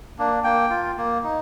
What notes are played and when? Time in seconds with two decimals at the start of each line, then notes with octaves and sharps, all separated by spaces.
0.19 A#3 D4
0.44 A#3 G5
0.70 F4
0.97 A#3
1.24 D#4